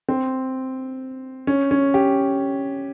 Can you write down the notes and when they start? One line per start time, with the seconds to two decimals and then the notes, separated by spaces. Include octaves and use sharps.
0.08 C4
1.47 C#4
1.71 C#4
1.94 G4